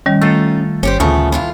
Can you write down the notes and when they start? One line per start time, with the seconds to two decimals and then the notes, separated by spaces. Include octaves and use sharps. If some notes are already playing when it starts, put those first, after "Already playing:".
0.06 D#3 G3 C#4
0.21 A3 D#4 F4 A4
0.83 G1 C#4 G4 C5
1.00 D2 A#2 C#3 A3 B3
1.32 A2 E3 F4